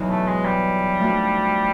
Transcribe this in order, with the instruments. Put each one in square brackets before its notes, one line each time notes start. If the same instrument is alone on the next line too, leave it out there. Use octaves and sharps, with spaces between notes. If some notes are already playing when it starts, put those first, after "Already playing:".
Already playing: [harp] E2 B2 F#3 B3 D#4
[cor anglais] A3
G#3
G3
[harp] F3 A3 D4 F#4